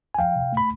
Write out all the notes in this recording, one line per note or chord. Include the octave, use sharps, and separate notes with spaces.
G#5
F3 F5 G5
C3
A3 B5